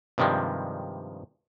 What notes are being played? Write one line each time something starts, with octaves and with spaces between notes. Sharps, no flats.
G2 C3 D#3 F3 G3 G#3